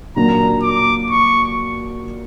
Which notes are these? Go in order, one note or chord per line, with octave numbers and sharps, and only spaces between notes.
A#2 F#3 A#3 D4 F#4 A#5
D6
C#6